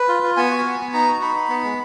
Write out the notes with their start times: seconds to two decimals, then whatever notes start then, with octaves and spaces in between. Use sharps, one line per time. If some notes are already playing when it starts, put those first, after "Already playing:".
Already playing: B4
0.09 F4
0.23 F4
0.37 B3 G#5
0.51 F#4
0.65 B3
0.80 B3
0.94 D#4 A#5
1.08 F#4
1.21 D#4 B5
1.35 D#4
1.49 B3
1.64 G#3